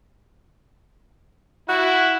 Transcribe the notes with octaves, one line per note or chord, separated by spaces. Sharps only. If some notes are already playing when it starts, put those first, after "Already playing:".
E4 F#4